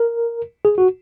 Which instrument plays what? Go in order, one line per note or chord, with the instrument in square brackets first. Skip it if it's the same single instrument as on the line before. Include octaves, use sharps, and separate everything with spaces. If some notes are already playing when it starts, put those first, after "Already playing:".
Already playing: [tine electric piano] A#4
G#4
F#4